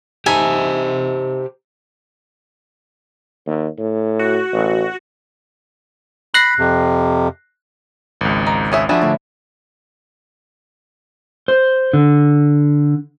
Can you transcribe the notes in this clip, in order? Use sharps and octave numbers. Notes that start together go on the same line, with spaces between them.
D#4 G4 C5 E5 G#5 A5
D#2
A2
F#4
A1
B5 F#6 A#6 C7
F2 C3
G#1 C#2
D#4
C#4 G#4 E5
F3 D4 F#4 G#4 E5 A5 B5
A2 D3
C5
D3